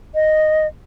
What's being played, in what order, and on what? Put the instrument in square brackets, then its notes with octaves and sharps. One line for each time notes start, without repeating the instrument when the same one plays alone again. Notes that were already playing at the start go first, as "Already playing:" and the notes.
[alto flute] D#5